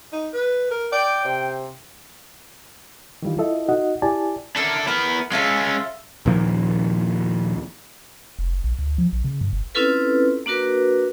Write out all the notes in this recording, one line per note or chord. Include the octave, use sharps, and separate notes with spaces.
D#4
B4
A#4
D5 G5
C3
D#3 E3 G3 F4
E4 F4 A4 D#5 E5
D#4 F#4 D#5 F#5
E4 G4 D5 G#5 A5
C#4 D4 E4 A4 A#4
B3 E4 A#4
G#3 C#4 F4 A4 E5
D#2 A#2 F3 A#3
F1
F#1
A#1
D2
F3
A#1
C#3
G2
G1
C4 C#4 E4 F4 A4 B4
A#3 D4 F#4 A#4 B4